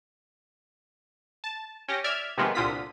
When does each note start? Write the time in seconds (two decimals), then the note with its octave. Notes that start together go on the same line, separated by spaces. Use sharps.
1.44 A5
1.88 C#4 G4 A#6
2.04 D5 E5 F6 G#6
2.37 C3 D#3 F3 G#3 A#3 B3
2.55 C2 A#2 D3 F4 D#6 B6